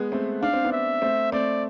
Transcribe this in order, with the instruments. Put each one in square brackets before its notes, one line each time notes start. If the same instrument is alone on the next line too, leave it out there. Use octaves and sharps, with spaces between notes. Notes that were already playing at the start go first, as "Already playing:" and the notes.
Already playing: [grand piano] G#3 B3
A3 C4
[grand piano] D4 [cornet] F5
[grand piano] C4
B3 D4
[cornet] E5
[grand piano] A3 C4
[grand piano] A3 C4 [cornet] D5